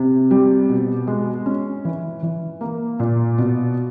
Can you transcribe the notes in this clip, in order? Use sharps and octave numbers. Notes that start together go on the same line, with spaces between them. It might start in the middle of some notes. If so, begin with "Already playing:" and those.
Already playing: C3
G3
B2
G#3
C#4
E3
E3
A#3
A#2
B2